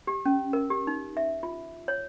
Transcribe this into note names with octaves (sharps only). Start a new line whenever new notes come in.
G4
C#4
A#4
G4
D#4
E5
F4
C#5